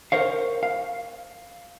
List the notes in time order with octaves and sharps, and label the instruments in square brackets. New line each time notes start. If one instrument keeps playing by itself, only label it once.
[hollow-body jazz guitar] A#4 C5 C#5 F5
F5